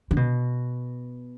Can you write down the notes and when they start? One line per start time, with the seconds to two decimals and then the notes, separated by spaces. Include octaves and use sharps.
0.11 D3
0.17 B2